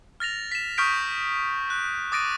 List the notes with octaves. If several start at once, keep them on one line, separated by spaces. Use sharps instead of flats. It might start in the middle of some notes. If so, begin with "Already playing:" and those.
F6 A6 A#6 F7
B6 E7
C#6 D#6 F6 G6 B6 D7
F#6
D6 D#6 A6 A#6 D7 D#7